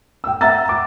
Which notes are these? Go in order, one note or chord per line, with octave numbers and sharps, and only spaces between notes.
G5 E6
E5 F#5 A#5 E6 A6
D6